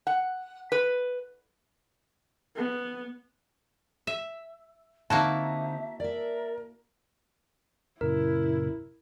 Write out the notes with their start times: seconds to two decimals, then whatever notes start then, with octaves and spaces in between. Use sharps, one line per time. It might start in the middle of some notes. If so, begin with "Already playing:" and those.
0.07 F#5
0.72 B4
2.56 B3
4.07 E5
5.10 D3 A#3 C4 D#4 E4 F#4 E5 A5
6.00 A#4 D5 E5
8.01 F#2 A#2 C#3 E4 A#4